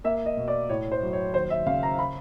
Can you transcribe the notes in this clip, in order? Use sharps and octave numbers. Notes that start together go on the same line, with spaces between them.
A#3 E5
D#5
B2
D5
A2 C#5
C5
F#3
C#5
D#2 C5
E5
C#3 F5
A#5
B5